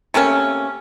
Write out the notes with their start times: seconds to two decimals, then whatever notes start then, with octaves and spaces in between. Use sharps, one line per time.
0.14 C3 A3 A#3 C#4